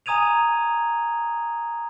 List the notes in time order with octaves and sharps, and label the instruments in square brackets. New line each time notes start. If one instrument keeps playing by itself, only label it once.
[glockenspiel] G#5 A#5 D#6 G#6 D#7 F7